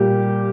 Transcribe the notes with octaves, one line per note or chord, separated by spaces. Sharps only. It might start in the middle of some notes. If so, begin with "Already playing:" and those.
Already playing: A#2 G3 A#3 G4